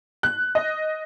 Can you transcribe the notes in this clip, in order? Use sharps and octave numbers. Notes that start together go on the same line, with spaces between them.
F#6
D#5